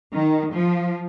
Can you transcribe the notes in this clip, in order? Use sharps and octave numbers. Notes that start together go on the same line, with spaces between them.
D#3
F3